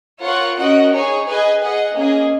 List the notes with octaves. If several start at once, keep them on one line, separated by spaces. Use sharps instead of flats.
F4 A#4 C#5 F#5
C#4 F#4 A#4 D#5 F#5
D#4 G#4 C#5
G#4 B4 D#5 G#5
G#4 D#5 F#5
A#3 C#4 G#4 D#5